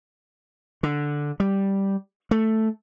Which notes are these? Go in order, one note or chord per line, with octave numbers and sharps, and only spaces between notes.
D3
G3
A3